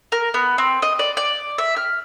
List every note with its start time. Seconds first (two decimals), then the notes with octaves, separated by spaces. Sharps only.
0.12 A#4
0.34 B3
0.58 C4
0.82 D#5
0.99 D5
1.17 D5
1.58 E5
1.76 F6